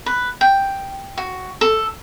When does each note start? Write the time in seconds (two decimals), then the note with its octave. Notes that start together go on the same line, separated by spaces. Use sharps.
0.06 B4
0.41 G5
1.18 F#4
1.61 A4